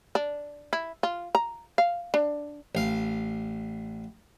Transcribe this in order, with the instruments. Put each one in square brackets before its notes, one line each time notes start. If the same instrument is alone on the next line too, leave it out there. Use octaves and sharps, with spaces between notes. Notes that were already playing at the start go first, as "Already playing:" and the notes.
[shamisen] D4
E4
F4
A#5
F5
D4
[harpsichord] A1 F5